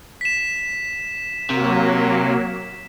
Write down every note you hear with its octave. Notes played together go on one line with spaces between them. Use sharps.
B6 E7
C3 F#3 A#3